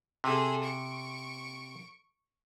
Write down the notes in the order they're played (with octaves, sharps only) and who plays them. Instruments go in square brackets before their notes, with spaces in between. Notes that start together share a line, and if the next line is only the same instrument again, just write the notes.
[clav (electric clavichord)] C3 [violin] G#4 A4
[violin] C#6 D7